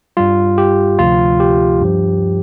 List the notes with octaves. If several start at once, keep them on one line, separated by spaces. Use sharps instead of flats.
G2 G3 F4
G4
D2 C3 F3 F4
G4
G2 F3